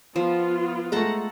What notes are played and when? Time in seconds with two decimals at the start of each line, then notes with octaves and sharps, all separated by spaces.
0.16 F3 B3 F4
0.92 G#3 A3 A4 F#5 A#5